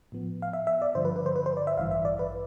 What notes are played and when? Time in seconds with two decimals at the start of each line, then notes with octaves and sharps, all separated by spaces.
0.12 A2 F3 B3
0.42 F5
0.53 E5
0.67 E5
0.82 D5
0.95 G2 D3 F3 C5
1.05 B4
1.16 B4
1.26 C5
1.36 B4
1.46 C5
1.57 D5
1.67 E5
1.77 A1 G2 E3 F5
1.91 E5
2.05 D5
2.19 B4